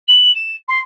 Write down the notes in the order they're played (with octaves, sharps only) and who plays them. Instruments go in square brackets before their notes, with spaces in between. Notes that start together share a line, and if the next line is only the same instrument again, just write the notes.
[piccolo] F#7
E7
C6